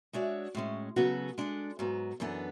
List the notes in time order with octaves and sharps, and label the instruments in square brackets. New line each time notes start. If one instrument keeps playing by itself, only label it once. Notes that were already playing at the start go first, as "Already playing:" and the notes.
[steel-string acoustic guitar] G#3 D4 F#4 C#5 E5
A2 G#3 C#4
C#3 F#3 B3 F#4 A4
G#3 D4 A4
G#2 F#3 B3
F#2 E3 B3 D4 A4